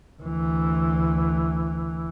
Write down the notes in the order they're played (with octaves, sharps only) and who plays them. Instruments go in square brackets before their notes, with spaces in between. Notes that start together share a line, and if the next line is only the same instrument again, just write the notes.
[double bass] D2 E3